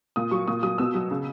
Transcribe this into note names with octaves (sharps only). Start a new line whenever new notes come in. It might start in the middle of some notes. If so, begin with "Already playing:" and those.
A#2 D#6
F#3 C#6
A#2 D#6
F#3 D#6
B2 E6
F#3
C#3